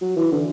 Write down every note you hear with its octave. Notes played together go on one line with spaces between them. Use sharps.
F#3
E3
D3